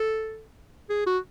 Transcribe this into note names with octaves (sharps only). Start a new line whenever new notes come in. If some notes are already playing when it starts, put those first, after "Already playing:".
Already playing: A4
G#4
F#4